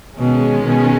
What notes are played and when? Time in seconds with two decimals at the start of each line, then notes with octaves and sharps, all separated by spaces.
0.18 B2 D#3 G#3 C#4
0.64 B2